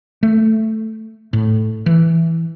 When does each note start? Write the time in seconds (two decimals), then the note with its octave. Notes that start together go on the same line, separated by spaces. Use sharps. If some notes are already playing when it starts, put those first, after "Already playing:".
0.23 A3
1.33 A2
1.86 E3